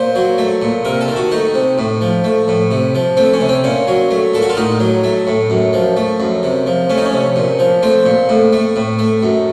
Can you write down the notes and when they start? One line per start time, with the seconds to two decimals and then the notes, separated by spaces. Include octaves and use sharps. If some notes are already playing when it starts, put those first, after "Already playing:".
Already playing: A#2 C5
0.15 F#3
0.38 A3
0.62 A#2
0.85 C3 A#4
1.01 A4
1.08 D#3
1.16 F#4
1.31 A3 D#4
1.54 C3
1.78 A2
2.01 F3
2.24 A3
2.48 A2
2.71 C3
2.95 F3
3.17 A3 C4
3.33 C#4
3.40 C3
3.49 C4
3.64 A#2 C#4
3.87 F#3
4.11 A3
4.34 A#2 A4
4.42 F#4
4.49 F4
4.57 A2 D#4
4.80 F#3
5.04 A3
5.27 A2
5.50 F#2
5.73 F3
5.97 A3
6.20 F#2
6.43 C3
6.66 F3
6.89 A3 C#4
6.98 D#4
7.05 C#4
7.13 C3
7.36 A#2
7.59 F3
7.83 A3 C4
8.06 A#2
8.29 A2
8.53 A3
8.76 A2
8.99 A3
9.23 F#2